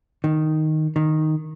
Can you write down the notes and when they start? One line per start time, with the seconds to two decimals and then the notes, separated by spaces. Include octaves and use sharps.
0.24 D#3
0.96 D#3